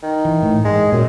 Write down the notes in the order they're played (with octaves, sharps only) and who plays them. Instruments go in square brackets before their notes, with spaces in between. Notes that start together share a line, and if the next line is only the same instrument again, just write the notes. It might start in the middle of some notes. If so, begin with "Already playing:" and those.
[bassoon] D#3
[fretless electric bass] E3
A2
[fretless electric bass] G#2 [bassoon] G#3
[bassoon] F#2 [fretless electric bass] A#2